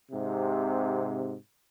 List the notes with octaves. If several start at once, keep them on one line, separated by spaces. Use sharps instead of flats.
G#2 C3